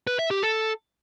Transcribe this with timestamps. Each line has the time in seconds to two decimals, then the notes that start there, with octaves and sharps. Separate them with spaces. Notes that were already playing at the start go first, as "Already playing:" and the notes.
0.07 B4
0.19 E5
0.31 G4
0.43 A4